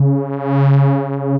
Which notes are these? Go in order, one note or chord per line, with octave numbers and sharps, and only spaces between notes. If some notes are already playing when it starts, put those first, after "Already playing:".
Already playing: C#3